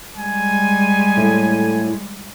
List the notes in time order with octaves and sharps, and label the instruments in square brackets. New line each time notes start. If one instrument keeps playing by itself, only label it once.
[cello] G3 G#3 [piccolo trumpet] G#5
[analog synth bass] A2